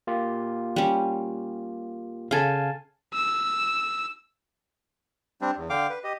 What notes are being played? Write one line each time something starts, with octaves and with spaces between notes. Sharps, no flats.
A#3 F4 G4
G3 C#4
C#3 A4 F5 G#5 A5
E6
G3 C4 D4
E2
D3 F5 G5 D6
B4
G4 D#5